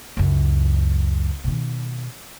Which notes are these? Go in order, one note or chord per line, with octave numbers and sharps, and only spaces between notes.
C#2 F#2
B2 D#3